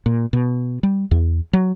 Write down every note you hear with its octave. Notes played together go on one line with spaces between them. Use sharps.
A#2
B2
G3
E2
F#3